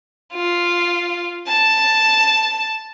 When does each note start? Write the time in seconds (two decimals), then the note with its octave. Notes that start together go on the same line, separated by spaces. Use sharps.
0.33 F4
1.48 A5